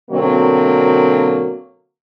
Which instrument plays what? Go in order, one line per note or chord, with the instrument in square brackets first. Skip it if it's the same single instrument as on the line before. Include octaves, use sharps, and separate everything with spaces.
[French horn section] B2 D3 F#3 A#3 C4